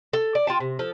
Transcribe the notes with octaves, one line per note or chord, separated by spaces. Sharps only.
A4
D5
F4 G5 A5
C3
F3 A4